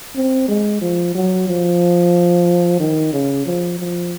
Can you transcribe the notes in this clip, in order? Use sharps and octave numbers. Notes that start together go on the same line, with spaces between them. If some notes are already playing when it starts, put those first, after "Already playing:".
C4
G#3
F3
F#3
F3
D#3
C#3
F3
F3